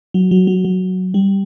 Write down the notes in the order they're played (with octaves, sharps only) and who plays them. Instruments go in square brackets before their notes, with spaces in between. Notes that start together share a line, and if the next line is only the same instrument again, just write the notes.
[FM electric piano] F#3
F#3
F#3
F#3
G3